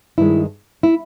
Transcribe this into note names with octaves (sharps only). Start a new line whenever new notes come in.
G2 D#3 G#3 E4
E4